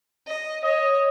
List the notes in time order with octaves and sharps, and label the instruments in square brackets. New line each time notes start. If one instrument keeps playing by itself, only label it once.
[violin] D#5
[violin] C#5 [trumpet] D#5